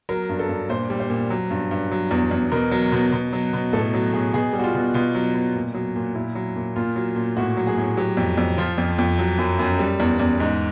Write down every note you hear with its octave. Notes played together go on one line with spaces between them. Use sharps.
F#3 A#4
G2
A4
G2
A#2 C5
G3
C5
A#2
F#3
G2
G2
F#3
E2
E2
B2 A#4
F#3
B2
B2
F#3
B2
A2 A4
F#3
A2 G#4
B2 G#4
G3
F#4
F4
B2
B2 F4
F#3
B2
A#2
F#3
A#2
A#2 E4
F#3
A#2
A#2 F4
F#3
A#2
A2 F#4
F#3
G#4
A2
F#3 G4
F2
F2
F3 F4
F2
F2
F#3
F#2
F#2
G3
E2
E2
G#2 D#4